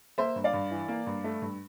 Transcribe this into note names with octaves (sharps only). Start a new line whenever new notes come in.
A#3 C5 E5
G2
D5 F5
G2
E3
A#3
G2
A3
G2